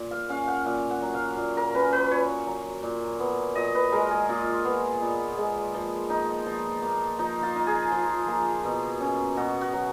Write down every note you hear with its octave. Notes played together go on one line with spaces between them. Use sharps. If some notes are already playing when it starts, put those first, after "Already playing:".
Already playing: A#2
F5
C#4 F5
F#5
A#2 F5
F#5
F#3
F5
A#2
A#4
C#4 B4
B4
A#2 C#5
F#3
A#2
B3
A#2 D#5
B4
G#3 A#4
G#4
A#2 F4
B3
A#2
G#3
F3
D#4
F3
A#3
F3 D#4
F4
D#4
G#4
F3
A#3
B2
C#4
B2 F#4
F#4
F#3